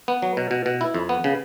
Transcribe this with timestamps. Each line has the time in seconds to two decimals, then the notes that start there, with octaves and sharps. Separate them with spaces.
0.08 B3
0.22 F#3
0.37 B2
0.51 B2
0.66 B2
0.81 E4
0.94 F2
1.09 B3
1.24 C#3